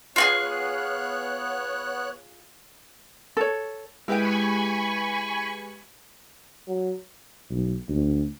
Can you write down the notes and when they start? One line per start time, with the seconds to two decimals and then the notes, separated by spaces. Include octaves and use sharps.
0.16 B3 F4 F#4 G#4 C#5 F#6
3.37 A4 C#5
4.08 G#3 E4 G4 B4 G5 G#5 B5 C#6
6.68 F#3
7.51 B1
7.88 D2